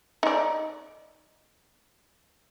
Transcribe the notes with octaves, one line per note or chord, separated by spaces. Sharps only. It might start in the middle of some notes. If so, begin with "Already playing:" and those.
D#4 D5